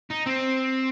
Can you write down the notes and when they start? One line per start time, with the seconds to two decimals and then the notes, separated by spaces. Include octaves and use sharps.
0.11 D#4
0.27 C4